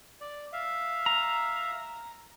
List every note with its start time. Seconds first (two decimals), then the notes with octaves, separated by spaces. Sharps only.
0.21 D5
0.53 E5 F5
1.06 A#5